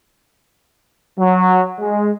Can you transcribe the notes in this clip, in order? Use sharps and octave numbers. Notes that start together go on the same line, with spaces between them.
F#3
G#3